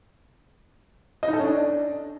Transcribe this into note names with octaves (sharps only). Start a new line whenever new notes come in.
D#5
D#4
A4
C#4
D4